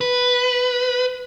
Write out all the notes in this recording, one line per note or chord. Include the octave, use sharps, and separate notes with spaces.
B4